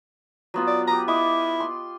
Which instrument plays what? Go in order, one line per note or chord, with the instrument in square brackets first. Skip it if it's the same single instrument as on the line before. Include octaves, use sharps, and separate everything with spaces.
[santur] F#3 B3 F4
[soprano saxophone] D5
[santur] G4 B4 [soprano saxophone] A#5
[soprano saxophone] E4 [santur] D#5 D6
[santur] C6